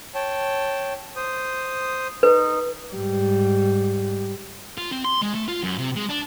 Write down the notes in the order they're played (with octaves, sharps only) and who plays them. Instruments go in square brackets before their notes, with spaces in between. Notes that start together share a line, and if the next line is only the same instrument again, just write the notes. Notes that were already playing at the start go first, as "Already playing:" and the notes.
[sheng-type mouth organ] C#5 G5 A5
C5 D#6
[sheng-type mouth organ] D#4 [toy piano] B4
[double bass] G#2 G3
[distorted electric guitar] F4
C4
C6
G#3
A3
F4
F#2
C3
G#3
D4